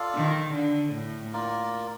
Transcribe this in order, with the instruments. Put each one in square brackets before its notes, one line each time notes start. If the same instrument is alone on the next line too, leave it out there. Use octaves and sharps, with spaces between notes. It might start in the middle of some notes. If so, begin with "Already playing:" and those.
Already playing: [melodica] F4 A4 D5 F5
[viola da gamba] D#3
D3
A2
[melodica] A#3 F4 A#4 D5